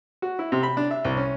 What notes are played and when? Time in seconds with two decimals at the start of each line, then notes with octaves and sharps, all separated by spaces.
0.22 F#4
0.39 E4
0.52 C3
0.63 B5
0.77 D4
0.91 E5
1.05 C2
1.17 C#4